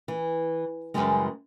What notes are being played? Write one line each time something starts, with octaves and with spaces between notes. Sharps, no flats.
E3
F#2 A#2 C#3 E3 G3 G#3